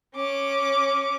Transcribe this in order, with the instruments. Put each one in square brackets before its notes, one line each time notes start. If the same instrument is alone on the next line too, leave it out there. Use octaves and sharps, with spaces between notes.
[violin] C#4 D6